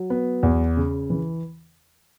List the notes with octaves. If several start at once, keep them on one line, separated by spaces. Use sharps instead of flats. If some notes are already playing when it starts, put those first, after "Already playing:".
Already playing: F#3
B3
E2
C#3
E3